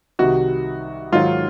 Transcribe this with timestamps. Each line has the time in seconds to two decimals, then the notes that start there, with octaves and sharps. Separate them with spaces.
0.19 C2 C3 D#3 F#4
1.12 G#2 D#3 F#3 F4